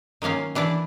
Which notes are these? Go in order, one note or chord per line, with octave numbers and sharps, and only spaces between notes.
D#3 F#3 A#3 C#4 F4
E3 D4 E4 D5